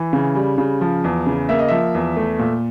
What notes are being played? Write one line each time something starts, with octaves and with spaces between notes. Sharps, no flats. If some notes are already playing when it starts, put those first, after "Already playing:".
Already playing: E3
C#3
G3
C#3
F3
E2
C#3
A#3 E5
D#5
F3 E5
E2
A3
A#2